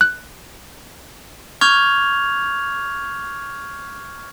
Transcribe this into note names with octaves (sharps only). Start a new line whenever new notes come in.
F#6
C#6 D6 F6 G6 G#6 F7